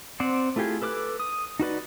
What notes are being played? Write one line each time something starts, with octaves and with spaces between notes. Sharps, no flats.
C4 C5 D5 F#5
A3 E4 F4 G4 G#4
A4 B4 D6 F6 F#6
D#6
D#4 F#4 B4 D5